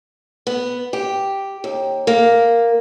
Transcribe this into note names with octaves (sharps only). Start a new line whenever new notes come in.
B3
G4
D#2
A#3